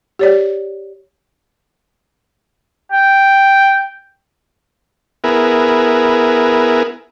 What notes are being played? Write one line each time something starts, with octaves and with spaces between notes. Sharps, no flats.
G4 C#5 D5
G5
B3 E4 G#4 A#4